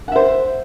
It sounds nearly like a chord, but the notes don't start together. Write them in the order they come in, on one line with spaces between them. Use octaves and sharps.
F#5 E5 C5